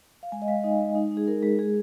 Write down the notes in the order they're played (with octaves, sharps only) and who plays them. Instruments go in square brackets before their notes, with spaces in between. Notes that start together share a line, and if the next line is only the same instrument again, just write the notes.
[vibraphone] F5
G#3 G#5
D#5
G#3 F5
D#4 D#5
G#3
D#4
D#4
G#4
D#4 A#4
G#3 G#4
G#3 G#4